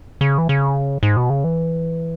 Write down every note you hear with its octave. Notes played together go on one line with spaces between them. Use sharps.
C#3
E3
C#3
G#2
B2
C#3
E3